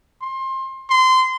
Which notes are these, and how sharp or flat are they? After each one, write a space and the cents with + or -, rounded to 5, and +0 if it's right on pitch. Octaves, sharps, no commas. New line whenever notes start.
C6 +25
C6 -20